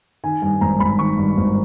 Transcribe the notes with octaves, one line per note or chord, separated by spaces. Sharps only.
D#3 G#5
G2 G#5
G#1 A#5
G#1 B5
D#3 C#6
G2
G#1